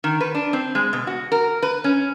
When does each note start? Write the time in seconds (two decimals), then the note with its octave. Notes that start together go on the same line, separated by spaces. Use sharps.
0.04 D#3
0.21 B4
0.35 D4
0.53 C4
0.75 G#3
0.93 B2
1.07 F#4
1.32 A#4
1.62 B4
1.84 C#4